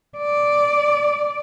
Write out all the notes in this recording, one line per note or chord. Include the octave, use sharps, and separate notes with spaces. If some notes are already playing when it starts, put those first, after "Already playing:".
D5